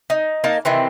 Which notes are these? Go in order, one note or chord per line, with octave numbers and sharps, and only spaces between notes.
D#4
A#3 D#4 A#4 A5
C3 D#3 E3 C4